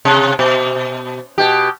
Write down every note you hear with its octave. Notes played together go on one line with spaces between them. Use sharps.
C3
B2
B2 G4